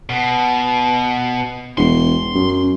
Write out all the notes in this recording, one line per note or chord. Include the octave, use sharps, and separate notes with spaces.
B2
E1 C6
F#2